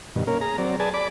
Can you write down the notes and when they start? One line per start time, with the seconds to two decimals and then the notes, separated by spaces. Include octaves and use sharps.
0.16 G2 B2 D#3
0.27 A#3 C#4 A#4
0.41 G#4 A#5
0.58 F#3 C4 D5
0.80 G#4 B4 D5 G#5 A5
0.94 D5 B5 D6